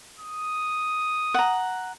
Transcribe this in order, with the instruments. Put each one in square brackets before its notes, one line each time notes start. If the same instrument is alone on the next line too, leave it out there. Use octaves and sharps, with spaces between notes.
[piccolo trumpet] D#6
[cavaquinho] F#5 A#5